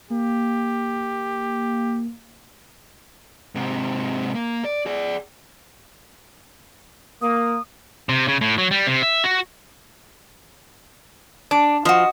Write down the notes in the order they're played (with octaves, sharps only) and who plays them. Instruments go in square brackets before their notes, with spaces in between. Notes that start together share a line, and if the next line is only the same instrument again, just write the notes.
[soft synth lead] A#3 [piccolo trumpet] G4
[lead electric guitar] G#2 C3
A#3
D5
G#4 D5
[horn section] A#3 [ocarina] D#6
[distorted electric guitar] C3
C#3
A2
F#3
G3
C3
E5
F#4
[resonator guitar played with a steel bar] D4 [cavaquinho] D6
[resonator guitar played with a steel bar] F3 [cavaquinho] F#4 D#5